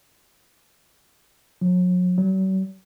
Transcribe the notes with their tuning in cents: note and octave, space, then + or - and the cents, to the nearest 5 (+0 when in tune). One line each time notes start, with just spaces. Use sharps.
F#3 -40
F#3 +45